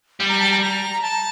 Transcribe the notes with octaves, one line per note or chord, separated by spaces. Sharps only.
G3
A#5
A5
A#5
A#5
A5